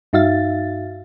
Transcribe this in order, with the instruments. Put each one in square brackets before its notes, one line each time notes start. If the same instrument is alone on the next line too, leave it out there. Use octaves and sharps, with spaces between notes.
[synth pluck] G2 D#4 F#4 E5 F5 A6